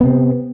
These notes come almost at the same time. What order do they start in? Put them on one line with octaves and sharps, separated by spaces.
B3 C3 C4